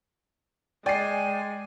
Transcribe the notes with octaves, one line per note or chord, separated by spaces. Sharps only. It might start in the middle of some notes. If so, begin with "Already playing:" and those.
G#3 D5 G5 G#5 C7